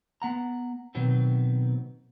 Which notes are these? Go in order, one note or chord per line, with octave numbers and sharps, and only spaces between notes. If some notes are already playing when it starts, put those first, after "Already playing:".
B3 F#5 A#5
B2 D#3 F#3 B3 C4